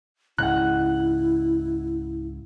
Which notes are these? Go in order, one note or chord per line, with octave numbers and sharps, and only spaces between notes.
C#2 G#2 C#3 E4 F#5 F#6